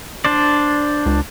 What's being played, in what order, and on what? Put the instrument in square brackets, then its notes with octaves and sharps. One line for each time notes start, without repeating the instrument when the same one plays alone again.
[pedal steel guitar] D4 C5 D5
[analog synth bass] C#2